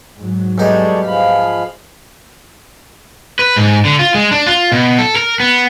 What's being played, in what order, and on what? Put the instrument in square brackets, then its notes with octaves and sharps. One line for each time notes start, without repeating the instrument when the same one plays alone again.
[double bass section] G#2 F#3
[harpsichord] E2 D#4 [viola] G3 G#3 [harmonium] A4 C#5 D5
[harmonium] F3 G#3 [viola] F5 B5
[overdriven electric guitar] B4
G#2
D3
F4
G#3
D4
F4
B2
A4
A#4
B3